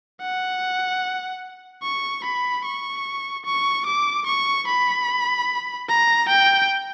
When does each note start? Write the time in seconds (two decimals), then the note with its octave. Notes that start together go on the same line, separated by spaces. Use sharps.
0.21 F#5
1.83 C#6
2.24 B5
2.65 C#6
3.45 C#6
3.86 D6
4.26 C#6
4.67 B5
5.88 A#5
6.28 G5